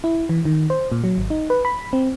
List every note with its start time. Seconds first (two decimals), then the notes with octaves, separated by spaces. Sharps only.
0.04 E4
0.29 E3
0.45 D#3
0.70 C5
0.92 A#2
1.04 F#3
1.18 G#1
1.30 D#4
1.50 B4
1.65 B5
1.93 C4